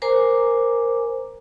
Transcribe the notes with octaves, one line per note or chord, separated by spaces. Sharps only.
A#4 C5 G#5 A#5 D6